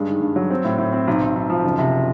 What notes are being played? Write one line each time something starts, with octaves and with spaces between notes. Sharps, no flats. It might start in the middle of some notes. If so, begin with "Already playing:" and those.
Already playing: G2 G#3
D#3
G2
F#3
C4
A2
A2
C4
B1
B1
B1
F3
F#1
C3